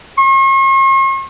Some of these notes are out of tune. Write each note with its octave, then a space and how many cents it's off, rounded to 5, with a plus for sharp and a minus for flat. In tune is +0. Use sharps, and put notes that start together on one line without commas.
C#6 -45